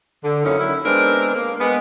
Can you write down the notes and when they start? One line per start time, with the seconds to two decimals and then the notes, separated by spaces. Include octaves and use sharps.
0.24 D3
0.45 F#2 A#3 C#4 D#4 E4
0.59 D#3 F#3 E4
0.85 G#3 B3 C4 D4 A#4
1.34 A#3
1.59 G#3 B3